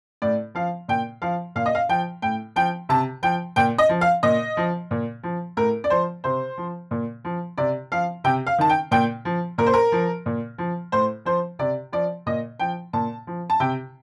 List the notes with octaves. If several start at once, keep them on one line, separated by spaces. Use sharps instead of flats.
A2 D5
F3 F5
A#2 G5
F3 F5
A#2 F5
D#5
F5
F3 G5
A2 G5
F3 G5
C3 A5
F3 G5
A#2 G5
D#5
F3
F5
A#2 D#5
F3
A#2
F3
A2 A#4
D5
F3 C5
C3 C5
F3
A#2
F3
C3 D5
F3 F5
C3 G5
F5
D#3 A5
G5
A#2 G5
F3
A#2 A#4
C5
A#4
F3
A#2
F3
A2 C5
F3 C5
C3 D5
F3 D5
A#2 D#5
F3 G5
A#2 A5
F3
A5
C3 G5